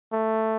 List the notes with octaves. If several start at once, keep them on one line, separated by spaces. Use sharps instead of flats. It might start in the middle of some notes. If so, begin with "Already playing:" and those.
A3